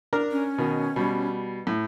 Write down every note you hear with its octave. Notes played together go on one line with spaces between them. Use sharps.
D4 A#4 A#5
C#4
B2 D#3
B2 G3
A2